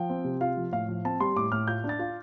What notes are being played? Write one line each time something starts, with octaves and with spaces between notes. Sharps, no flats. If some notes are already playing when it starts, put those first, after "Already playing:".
Already playing: F3 G5
C4
C3
F4 F5
F3
A2 F5
F3
C4 A5
G3 C6
A2 D6
A2 F6
F4 G6
D4
A6
F4